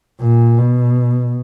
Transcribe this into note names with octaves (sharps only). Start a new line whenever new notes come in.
A#2
B2